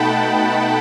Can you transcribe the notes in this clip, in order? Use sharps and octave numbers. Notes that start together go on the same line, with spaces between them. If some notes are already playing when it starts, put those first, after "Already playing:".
Already playing: B2 A3 D#4 F#5 G5 A5 B5